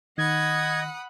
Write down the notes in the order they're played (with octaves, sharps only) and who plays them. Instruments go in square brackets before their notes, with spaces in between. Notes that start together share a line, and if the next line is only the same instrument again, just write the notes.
[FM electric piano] D#3 [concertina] D#5 [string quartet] F#5 B5 D#6 [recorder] G#6